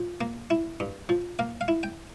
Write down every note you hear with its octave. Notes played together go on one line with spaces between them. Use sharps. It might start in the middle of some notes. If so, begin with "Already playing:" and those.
Already playing: F3
A#3
E4
G2
F3
A#3 F5
F5
E4
G5